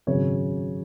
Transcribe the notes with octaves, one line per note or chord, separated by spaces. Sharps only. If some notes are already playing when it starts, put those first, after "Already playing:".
G#1 F#2 C#3 C#5